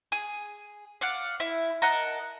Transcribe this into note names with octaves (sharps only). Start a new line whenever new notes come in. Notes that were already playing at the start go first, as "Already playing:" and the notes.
G#4
D5 F5 F#5
E4
A#4 D#5 F#5 A5